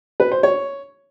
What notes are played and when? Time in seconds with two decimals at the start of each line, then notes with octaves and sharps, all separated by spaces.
0.20 B4
0.31 C5
0.43 C#5